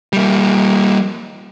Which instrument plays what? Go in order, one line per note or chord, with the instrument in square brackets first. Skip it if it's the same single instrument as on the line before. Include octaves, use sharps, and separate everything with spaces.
[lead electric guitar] G3 A#3